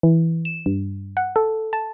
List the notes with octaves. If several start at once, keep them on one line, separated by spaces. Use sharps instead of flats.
E3
E7
G2
F#5
A4
A5